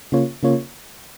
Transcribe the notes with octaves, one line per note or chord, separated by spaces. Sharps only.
C#3 A#3 F4 C#5
C#3 A#3 F4 C#5